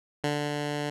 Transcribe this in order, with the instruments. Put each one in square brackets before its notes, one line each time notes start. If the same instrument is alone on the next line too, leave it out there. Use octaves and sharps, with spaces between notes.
[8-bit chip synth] D3